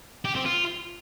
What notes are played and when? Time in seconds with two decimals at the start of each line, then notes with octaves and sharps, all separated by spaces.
0.25 G4
0.35 C4
0.46 F4